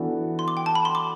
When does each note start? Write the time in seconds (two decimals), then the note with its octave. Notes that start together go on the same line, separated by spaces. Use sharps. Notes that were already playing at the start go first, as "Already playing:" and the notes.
Already playing: E3 B3 D4 F#4 A4
0.39 C6
0.48 D6
0.57 G5
0.66 A5
0.75 B5
0.85 C6
0.95 D6